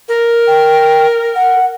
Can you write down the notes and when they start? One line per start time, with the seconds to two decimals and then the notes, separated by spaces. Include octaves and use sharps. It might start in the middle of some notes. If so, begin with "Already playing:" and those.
0.09 A#4
0.47 G5
1.35 F#5